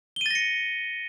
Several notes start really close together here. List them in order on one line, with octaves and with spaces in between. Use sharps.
G7 D#7 A6 A#6 C#7